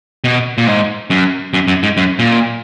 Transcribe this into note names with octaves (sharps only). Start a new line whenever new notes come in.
B2
A#2
G#2
F#2
F#2
F#2
G#2
F#2
A#2